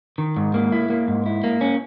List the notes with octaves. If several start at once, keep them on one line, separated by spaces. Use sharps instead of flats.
D#3
G#2
A#3
E4
A#3
G#2
E4
A#3
C#4